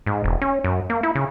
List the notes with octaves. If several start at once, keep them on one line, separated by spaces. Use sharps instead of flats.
G#2
E1
C#4
F#2
A#3
E4
C#3